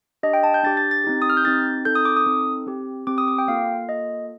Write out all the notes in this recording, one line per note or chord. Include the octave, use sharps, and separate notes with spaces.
D4 G4 D#5
G5
A5
G6
D4 G4 A6
A6
A6
C4 D#4 G4
D#6
F6
G6
C4 D#4 G4 A6
C4 D#4 A4 G6
D#6
D6
D#6
C4 D#4 A4
C4 G4
C4 G4 D6
D#6
D6
G5
A#3 F4 A4 F5
A#3 F4 A4 D#5